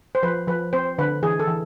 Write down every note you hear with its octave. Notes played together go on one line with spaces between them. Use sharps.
C5
F3 B4
F3 B4
C4 C5
D3 B4
E3 G#4
A4
E3